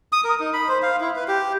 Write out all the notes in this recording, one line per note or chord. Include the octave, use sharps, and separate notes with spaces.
D#6
A#4
D#4
B5
C5
F5
E4
B4
G4